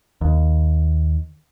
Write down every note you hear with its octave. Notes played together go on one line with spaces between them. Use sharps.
D#2